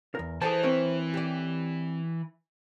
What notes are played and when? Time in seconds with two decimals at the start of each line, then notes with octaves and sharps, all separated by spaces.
0.15 E2 A#4
0.42 E3 G#4 A4 C5 D5 A5
0.63 C4 A#4 C#5
1.14 G4 D5